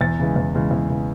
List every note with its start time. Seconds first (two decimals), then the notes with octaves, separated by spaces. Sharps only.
0.01 E2 A6
0.19 C#3 E3 G#3
0.36 E2
0.55 C#3 E3 G#3
0.71 E2
0.90 C#3 E3 G#3